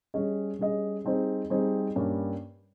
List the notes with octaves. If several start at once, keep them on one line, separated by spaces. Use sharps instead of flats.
G3 C#4 G#4 D#5
G3 C#4 G#4 D#5
G3 C4 D#4 G#4 C5
G3 C4 D#4 G#4 C5
G2 G3 A#3 C#4